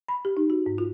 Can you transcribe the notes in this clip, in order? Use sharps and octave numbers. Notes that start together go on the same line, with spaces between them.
B5
G4
D#4
F#4
G#2
F4